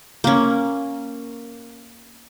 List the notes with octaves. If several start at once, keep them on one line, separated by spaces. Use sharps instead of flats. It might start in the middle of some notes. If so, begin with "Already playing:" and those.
A#3 C#4